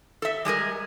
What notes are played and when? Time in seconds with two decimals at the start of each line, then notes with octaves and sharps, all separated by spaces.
0.22 A4 E5
0.45 G3 G#3 G#4 A#4